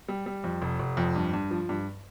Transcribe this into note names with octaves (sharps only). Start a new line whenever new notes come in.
G3
G3
F2
F1
F1
F2
G2
G2
F3
G2